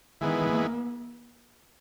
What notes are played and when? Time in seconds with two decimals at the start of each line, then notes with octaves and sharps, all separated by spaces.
0.21 D#3 E3 G#3 B3
0.50 A#3